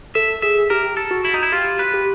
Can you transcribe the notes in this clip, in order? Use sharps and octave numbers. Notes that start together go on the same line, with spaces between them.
A4 E5
G#4 E5
G4 A#4
A4
F#4
E4
D#4
E4
F4 G4
B4
G4